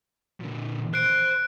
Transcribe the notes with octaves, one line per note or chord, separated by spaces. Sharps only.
A#2 D3
C5 F#6 D7